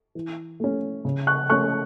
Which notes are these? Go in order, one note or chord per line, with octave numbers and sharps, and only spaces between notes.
E3
A3 C#4
C#3
C#6 F#6
A3 C#4 C#6 F#6